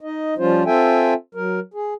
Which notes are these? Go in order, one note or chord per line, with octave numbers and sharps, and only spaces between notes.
D#4 D#5
F3 G3 C#4 F4 C5
C4 F4 A4 E5 G5 G#5
F#3 A#4
G#4